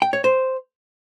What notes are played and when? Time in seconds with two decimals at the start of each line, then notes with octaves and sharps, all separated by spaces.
0.02 G5
0.13 C#5
0.24 C5